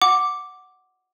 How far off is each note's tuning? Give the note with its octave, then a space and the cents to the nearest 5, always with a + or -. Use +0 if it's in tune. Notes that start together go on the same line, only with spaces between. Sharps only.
F#5 +0 D6 +0